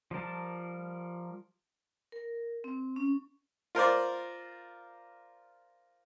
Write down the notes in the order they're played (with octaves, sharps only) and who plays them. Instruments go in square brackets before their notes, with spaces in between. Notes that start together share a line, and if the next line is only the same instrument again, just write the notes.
[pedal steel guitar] F3 G3 A#4 A5
[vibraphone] A#4
C4
C#4
[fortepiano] F4 A#4 C5 D5